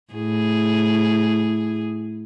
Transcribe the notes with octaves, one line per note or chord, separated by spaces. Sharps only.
A2 E4 G#4